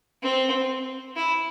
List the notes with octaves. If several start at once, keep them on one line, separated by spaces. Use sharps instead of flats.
C4
E4